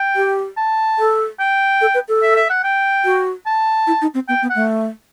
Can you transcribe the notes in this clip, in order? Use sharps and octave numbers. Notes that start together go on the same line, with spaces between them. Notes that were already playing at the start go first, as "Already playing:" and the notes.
Already playing: G5
G4
A5
A4
G5
A4
B4
A4
E5
E5
F#5
G5
F#4
A5
E4
D#4
C4
B3 G5
B3
F#5
A3